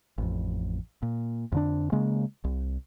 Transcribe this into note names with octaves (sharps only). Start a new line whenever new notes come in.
A1 F2
A#2
F2 D3 D4
C#3 G#3 A#3
C2